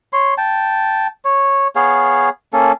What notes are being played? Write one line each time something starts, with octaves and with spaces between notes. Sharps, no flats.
C#5 C6
G5 A5
C#5
B3 G#4 C#5 F5
A#3 C#4 A4